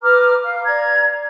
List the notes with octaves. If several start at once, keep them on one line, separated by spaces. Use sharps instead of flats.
B4 A#5 D6 F6
F5
D5 A#5 G#6